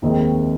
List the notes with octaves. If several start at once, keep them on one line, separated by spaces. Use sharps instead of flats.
F1 D#2 D#3 G#3 C4